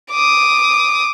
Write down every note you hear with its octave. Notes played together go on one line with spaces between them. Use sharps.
D6 D#6